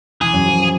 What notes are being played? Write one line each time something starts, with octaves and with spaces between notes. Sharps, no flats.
E3 G#4
F#2 F#3
F3
F3